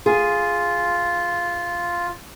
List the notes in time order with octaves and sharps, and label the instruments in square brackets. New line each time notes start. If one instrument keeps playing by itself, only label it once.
[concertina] F4 [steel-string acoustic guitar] G#4